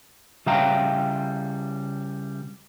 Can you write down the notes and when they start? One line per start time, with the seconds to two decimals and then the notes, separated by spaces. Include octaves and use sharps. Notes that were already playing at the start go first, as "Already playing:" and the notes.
0.46 C#3 G3 E5 F5 G5 A#5